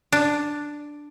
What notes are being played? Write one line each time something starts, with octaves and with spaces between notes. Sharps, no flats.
D4